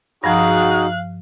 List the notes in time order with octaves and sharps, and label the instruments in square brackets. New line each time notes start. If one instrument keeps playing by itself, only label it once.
[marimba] G2 F3 [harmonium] D#4 F#4 G#4 [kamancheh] F5 F#6